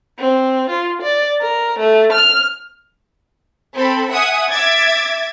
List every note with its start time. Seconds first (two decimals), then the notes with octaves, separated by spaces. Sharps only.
0.19 C4
0.70 F4
1.02 D5
1.41 A#4
1.79 A3
2.13 F6
3.74 C4 A4 B5
4.10 E5 F#5 G#5 D#6
4.49 E5 D6 G#6 A6